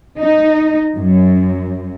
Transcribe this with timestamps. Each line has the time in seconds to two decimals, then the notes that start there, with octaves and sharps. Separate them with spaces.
0.20 D#4
0.96 F#2